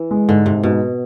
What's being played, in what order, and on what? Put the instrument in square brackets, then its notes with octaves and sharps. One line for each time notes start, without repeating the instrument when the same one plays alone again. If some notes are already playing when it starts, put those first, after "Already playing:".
Already playing: [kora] E3
[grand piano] G#3
[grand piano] G#2 [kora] D3
[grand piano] G#2 [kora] C3
[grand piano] G#2 [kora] B2